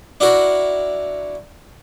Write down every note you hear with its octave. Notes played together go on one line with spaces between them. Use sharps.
D4 E4 F#4 A#4